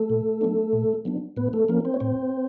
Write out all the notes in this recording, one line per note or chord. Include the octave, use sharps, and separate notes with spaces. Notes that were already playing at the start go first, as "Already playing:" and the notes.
Already playing: A3 A4
A#2
F#3 B3 D4
A#2
F#3 B3 D4
A2 B3 B4
A3 A4
F3 A#3 C#4 A#4
C4 C5
C#5
A2 C4 C5